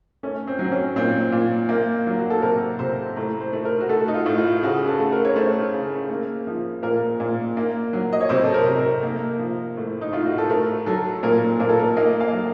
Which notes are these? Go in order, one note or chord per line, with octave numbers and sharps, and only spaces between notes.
A3 C#4
C4
F#3
C4
C#4
A#2 C4
A#2
A#3
F#3
F#4
A4
C3 A#4
C3 C5
A2 A#5
C5
A3
A#4
F#4
A3 A4
D#4
F4
A2
F4
C#3 F#4
A4
A3
A#4
C#5
A3 C5
C#3
A#3
F3
A#2 A#4
A#2
A#3
F#3
D#5
C#5
C3 C5
A4
A#4
C3
A#4
A#3
F3
A2
D#4
A2 F4
F#4
A4
A3 A#4
F#3 A4
A#2 A#4
A#2 A#4
A4
A#4
A#3 D#5
F5
F#3